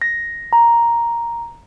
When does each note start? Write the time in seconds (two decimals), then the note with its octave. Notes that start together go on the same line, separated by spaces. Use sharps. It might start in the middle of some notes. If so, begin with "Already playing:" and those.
0.02 A#6
0.53 A#5